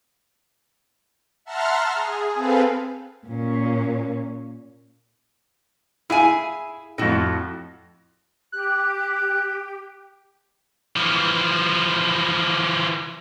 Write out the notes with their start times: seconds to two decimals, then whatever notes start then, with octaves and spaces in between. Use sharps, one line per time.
1.44 E5 F#5 A5 A#5 C6 F6
1.94 G#4
2.34 C4 G#4 A4 B4 F5
3.26 A#2 C#4
6.10 E4 G#4 F5 G#5
6.98 F2 A2 C4 F#4
8.52 G4 F#6
10.96 E3 F3